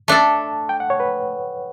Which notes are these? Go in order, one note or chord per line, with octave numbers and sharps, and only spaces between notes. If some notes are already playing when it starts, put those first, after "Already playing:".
A3 D4 A4 A5
G5
F#5
C#5
B4